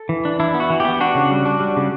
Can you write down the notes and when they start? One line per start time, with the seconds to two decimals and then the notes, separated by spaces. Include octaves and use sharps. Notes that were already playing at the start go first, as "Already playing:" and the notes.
Already playing: A4
0.09 E3
0.25 D4
0.40 D4 E4
0.54 B3
0.60 F#4
0.70 E3
0.80 B3 G4
1.00 D4 F#4
1.15 C#3
1.31 G3
1.46 D4
1.60 G3
1.77 C#3